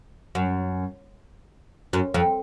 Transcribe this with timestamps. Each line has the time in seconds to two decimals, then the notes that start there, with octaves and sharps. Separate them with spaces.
0.35 F#2
1.93 F#2
2.14 F2